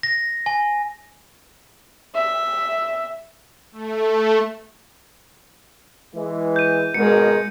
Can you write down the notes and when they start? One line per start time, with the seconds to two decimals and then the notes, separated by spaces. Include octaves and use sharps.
0.03 A#6
0.46 G#5
2.14 E5
3.72 A3
6.15 E3 G#3
6.56 G6 D#7
6.94 G#1 B2 G#3 A#4 C#7